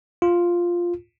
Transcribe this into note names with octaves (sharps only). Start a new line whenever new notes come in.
F4